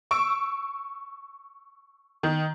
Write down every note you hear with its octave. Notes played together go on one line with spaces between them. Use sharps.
C#6 E6 D7
D#3